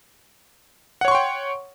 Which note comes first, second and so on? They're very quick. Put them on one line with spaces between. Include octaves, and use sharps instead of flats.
F#5 C#5 C#6 C6 G5